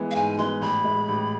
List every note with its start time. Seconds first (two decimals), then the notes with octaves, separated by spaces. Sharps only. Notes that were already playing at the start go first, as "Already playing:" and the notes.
Already playing: E3 G#3 B3
0.11 F5
0.15 G#2 G#5
0.38 E3 G#3 B3 C6
0.61 A1 B5
0.84 A2 G#3
1.08 A1